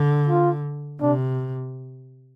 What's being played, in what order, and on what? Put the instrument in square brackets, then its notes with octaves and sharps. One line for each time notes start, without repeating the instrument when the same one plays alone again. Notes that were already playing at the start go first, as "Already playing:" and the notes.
Already playing: [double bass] D3
[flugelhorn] F4
[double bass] C3 [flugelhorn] D4